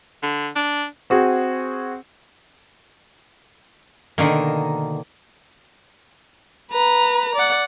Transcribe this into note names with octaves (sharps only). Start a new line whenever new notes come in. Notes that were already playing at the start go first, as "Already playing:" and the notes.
D3
D4
C4 F#4 G#4
B2 D3 D#3 A#3
B4 A#5
D5 F#5